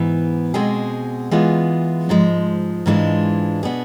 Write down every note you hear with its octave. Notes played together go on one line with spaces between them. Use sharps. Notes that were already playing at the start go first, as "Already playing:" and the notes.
Already playing: G#2 E3 B3
B2 G#3 C4 G#4
E3 G#3 B3 F4 G#4
G#2 F3 G#3
G#2 E3 G#3 D4 F4
B2 B3 D4 G#4